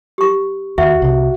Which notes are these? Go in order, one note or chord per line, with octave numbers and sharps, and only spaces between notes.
G4 C#6
D#2 F#4 E5
C2 C3